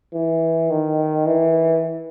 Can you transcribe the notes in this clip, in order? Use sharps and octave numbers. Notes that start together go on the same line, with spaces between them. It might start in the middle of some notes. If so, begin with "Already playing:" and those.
E3
D#3
E3